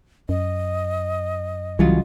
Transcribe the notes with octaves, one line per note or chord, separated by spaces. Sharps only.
F#2 D#5
C2 C#3 E3 F#3 G3 F4